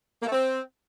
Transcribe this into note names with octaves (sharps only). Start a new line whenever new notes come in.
A#3
A3
C4